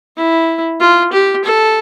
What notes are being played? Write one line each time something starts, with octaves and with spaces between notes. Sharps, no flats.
E4
F4
G4
A4